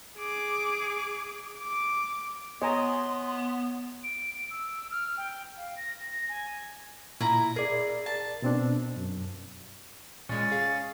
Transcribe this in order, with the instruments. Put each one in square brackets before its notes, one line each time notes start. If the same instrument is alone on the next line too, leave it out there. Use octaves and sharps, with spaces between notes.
[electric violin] G#4 D6
D6
[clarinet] B3 [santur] C#5 [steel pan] D#5 G#5 A#5 [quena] C6
[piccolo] D7
D7
E6
F6
G5
F5
A#6
G#5
[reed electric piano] A#2 [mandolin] E4 A#5
[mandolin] G#4 [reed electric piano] A#4 D5
[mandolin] A5
[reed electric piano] B2 C4 D4
F#2
[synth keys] A#2 G#3 [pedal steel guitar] C#4 [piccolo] A6
[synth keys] G#4 F5